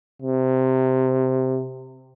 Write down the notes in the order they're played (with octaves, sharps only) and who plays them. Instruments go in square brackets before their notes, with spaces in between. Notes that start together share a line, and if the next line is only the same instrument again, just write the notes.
[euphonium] C3